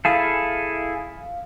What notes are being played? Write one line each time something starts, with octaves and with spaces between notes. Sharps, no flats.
E4 G#4 A4 F5